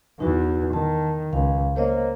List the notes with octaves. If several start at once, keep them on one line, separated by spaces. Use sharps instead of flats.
E2 E3 D#4 F#4
D#3 A5
C#2 F5
A#3 C5 C#5 D#5